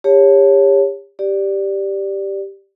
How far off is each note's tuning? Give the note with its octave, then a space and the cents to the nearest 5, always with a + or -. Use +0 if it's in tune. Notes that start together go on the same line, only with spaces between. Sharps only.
G4 +35 C#5 +0 A5 +0
G4 +0 D5 +0